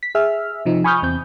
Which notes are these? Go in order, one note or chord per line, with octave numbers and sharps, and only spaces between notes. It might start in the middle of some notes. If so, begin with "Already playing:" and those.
B6
G#4 E5 F6
C3 F3 D#4
G#5 B5 C#6 D#6 F6 G6
E2 C4 G6